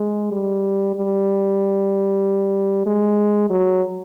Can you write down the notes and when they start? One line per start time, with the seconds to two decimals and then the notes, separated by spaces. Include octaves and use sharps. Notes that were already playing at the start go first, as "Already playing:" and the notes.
Already playing: G#3
0.32 G3
0.95 G3
2.86 G#3
3.50 F#3